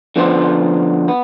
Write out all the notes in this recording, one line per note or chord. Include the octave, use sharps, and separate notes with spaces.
D3 F3 B3 F4 C5
B3